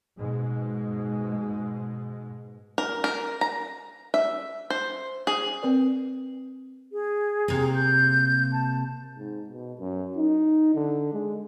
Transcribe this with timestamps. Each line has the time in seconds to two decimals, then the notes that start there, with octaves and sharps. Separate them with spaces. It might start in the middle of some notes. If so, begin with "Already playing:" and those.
0.18 G#2 B2 G#3
2.78 A#4
3.04 A#4
3.41 A#5
4.14 E5
4.70 C5
5.27 G#4
5.62 C4 A#4 B4 D5
6.93 G#4
7.48 C3 A#3
7.75 G6
8.53 A5
9.17 G#2
9.49 B2
9.80 F#2
10.17 D#4
10.75 D3
11.13 G#3